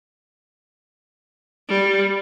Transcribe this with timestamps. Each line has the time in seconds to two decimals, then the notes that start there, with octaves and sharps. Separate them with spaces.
1.68 G3